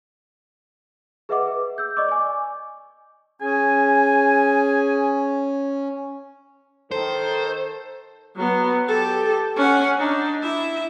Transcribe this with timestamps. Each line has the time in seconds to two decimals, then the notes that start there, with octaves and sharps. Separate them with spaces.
1.29 G#4 B4 D#5 E5 F#5 D6
1.46 G#4 B4
1.78 E6 G6
1.97 D5 D#5 C#6 D6
2.08 G#5 D6
3.42 C#4 G#4 G#5
6.91 D#3 A4 C5
8.36 F#3 B3
8.88 G4 A4
9.56 C#4 F#5
9.98 D4 D#4
10.41 E4 E5